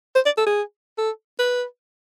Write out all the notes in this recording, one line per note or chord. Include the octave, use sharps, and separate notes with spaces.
C5
D5
A4
G#4
A4
B4